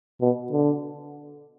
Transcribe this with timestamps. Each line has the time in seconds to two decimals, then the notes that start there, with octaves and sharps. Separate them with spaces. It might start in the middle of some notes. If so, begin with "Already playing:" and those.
0.21 B2
0.52 D3